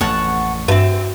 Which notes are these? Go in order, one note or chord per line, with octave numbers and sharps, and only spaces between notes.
A1 F2 A2 C#5 F#5 A5
G2 A3 C4 F#4 E5